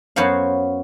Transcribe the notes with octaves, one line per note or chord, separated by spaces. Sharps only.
F#2 B3 F#4 C5 C#5 F5